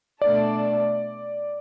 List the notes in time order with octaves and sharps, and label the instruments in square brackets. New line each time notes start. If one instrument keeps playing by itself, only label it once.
[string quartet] B2 A3 D4 A4 [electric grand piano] D5